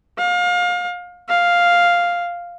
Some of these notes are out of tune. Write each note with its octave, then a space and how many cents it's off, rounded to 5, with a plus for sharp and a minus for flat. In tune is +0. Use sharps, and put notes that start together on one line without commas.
F5 +30
F5 +0